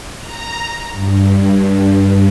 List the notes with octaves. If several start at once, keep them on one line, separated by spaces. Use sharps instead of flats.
A#5
G2